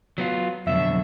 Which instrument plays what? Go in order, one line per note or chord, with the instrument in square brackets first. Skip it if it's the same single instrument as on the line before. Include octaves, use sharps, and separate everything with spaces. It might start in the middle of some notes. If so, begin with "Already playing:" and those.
[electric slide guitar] F#3 B3 F4
[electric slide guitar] F2 B2 D3 [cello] F#3 [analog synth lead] E5